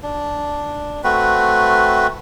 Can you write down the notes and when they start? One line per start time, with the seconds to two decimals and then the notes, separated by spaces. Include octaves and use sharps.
0.03 D4
1.04 A3 C4 F#4 B4